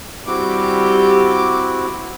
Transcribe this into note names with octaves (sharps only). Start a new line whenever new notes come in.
G3 C4 E4 F#4 G4 D6